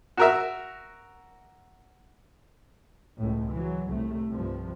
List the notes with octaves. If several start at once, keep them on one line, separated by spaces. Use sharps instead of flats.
F#4 A#4 E5
C#2 A2
E3 F#3
C2 A2 A3
C2 G2 F3